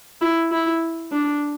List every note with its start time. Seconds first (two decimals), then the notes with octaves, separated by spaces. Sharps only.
0.21 E4
0.51 E4
1.12 D4